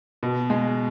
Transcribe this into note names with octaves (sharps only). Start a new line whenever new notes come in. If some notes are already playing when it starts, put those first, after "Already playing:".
B2
G#3